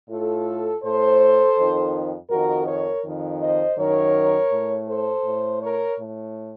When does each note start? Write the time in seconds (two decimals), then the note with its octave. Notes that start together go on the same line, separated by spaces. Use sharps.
0.09 A2 F4 A4
0.83 A2 A4 C5
1.57 F2 D#3
2.30 F2 D#3 F#4 A#4
2.67 A#4 C#5
3.04 F2 D#3
3.41 C5 D#5
3.78 F#2 D#3 A#4 C#5
4.51 A2
4.88 A4 C5
5.25 A2
5.61 A#4 C#5
5.98 A2